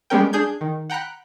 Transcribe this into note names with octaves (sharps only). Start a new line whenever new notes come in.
G3 G#3 B3 C#4 A#4 G5
D4 G#4 G6 G#6
D#3
F#5 G5 A#5 B5 F#6